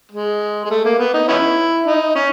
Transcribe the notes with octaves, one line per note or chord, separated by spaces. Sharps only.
G#3
G#3
A3
A#3
B3
D#4
B3 C#4 E4
D#4
C#4